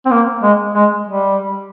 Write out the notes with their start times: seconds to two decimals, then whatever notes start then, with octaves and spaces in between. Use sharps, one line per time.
0.05 C4
0.11 A#3
0.43 G#3
0.74 G#3
1.07 G3